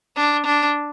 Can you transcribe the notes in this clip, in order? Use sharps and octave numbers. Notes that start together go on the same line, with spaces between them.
D4
D4